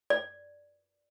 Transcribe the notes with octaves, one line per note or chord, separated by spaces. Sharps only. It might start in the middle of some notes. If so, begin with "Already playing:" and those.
D5